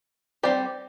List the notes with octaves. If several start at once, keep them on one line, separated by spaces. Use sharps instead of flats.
G3 C4 G4 D5